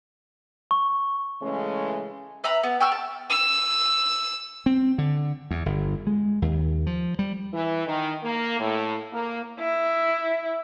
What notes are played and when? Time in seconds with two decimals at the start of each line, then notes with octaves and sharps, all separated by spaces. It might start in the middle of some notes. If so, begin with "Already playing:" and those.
0.71 C#6
1.42 C#3 E3 G#3 A3 C#4
2.44 B4 E5 A#5 B5
2.63 B3
2.80 G5 C#6 E6 F6
2.92 A5
3.30 E6
4.66 C4
4.98 D3
5.51 E2
5.66 G1
6.07 G#3
6.42 D#2
6.87 F3
7.19 G3
7.52 E3
7.87 D#3
8.23 A#3
8.59 A2
9.13 A#3
9.59 E4